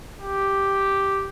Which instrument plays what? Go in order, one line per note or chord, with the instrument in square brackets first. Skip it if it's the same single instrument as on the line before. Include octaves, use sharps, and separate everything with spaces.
[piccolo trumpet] G4